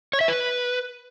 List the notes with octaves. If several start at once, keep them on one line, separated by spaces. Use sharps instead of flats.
C#5
E5
B4